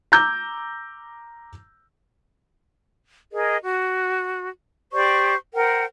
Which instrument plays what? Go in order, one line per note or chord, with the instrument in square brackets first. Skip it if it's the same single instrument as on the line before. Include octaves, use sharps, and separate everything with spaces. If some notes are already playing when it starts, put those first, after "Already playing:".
[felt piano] A#5 D6 E6 G6
[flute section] G#4 A#4 D#5
F#4
G4 C5 D5 C#6
A#4 C5 F#5 G5